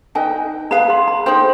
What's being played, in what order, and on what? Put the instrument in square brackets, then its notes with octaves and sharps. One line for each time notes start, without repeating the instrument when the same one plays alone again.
[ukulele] D#4 B4 D#5 G5 [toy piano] G#5
[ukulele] G#4 B4 F5 [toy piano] B5
[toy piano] C6
B5
[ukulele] D#4 G#4 C5 G5 [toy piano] C6